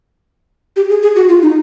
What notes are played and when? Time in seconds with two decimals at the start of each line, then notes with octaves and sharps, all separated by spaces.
0.76 G4
0.89 G#4
1.02 G#4
1.16 F#4
1.29 F4
1.42 D#4